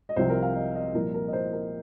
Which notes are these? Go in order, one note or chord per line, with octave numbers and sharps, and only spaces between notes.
D#5
C2 C3 F3 C5
A#4
F5
D#5
D#5
C2 A#2 F3 A#4
A#4
D#5
C5
A#4